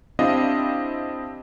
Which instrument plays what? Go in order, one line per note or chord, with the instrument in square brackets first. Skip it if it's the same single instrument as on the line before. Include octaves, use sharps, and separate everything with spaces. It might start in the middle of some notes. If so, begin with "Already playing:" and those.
[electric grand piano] C4 D4 E4 G4 D#5 F5